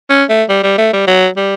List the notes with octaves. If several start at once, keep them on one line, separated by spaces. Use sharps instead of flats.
C#4
A3
G3
G3
A3
G3
F#3
G3